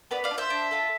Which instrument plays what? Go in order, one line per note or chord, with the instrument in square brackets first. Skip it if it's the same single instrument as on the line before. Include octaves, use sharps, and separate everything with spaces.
[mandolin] B3 B4 D5
D5 F5
D4
F4 C5 E5
D4
F4 A4